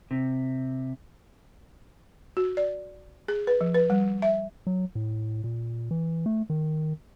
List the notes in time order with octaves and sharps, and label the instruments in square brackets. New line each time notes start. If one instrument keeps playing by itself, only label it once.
[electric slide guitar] C3
[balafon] F#4
D5
G#4
B4
F3
B4
G3
E5
[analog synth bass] F#3
A2
A#2
E3
A3
D#3